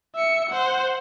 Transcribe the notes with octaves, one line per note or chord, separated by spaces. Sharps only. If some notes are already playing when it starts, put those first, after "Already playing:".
E5 C#7
C5 F#5